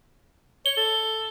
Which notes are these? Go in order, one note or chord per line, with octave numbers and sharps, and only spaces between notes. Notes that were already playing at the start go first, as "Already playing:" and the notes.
C#5 G7
A4